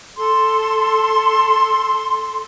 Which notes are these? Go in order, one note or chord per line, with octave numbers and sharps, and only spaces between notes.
A4 C6